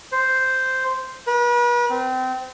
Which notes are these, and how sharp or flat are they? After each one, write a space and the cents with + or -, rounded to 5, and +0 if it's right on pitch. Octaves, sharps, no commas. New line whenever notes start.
C5 -5
B4 -40
C4 -30